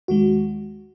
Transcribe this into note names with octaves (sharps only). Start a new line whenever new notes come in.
D#2 D#3 G#3 F#4